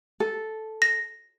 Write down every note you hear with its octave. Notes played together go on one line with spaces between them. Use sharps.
A4
A#6